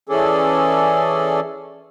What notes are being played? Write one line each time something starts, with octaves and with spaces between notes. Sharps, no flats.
E3 C#4 G#4 A4 D5